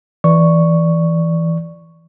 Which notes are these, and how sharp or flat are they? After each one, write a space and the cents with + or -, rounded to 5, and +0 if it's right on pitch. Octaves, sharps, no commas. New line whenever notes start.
E3 +0 D5 +0 C#6 +0